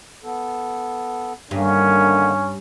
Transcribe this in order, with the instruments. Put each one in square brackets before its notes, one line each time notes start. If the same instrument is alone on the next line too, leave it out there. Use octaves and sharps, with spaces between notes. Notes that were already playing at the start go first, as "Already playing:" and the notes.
[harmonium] B3 A4
[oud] G2 [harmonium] D3 D#3 A#3 [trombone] C#4